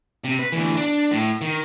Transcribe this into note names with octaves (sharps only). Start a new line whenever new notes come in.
C3
B4
D2 E3
D4
A2
D#3